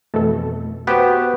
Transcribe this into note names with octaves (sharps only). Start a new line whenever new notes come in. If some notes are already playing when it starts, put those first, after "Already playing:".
F2 B2 E3 A3 A4
B3 F#4 G4 B4 C5